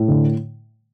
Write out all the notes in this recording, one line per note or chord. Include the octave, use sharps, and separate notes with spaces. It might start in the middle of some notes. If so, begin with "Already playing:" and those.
Already playing: A2
D3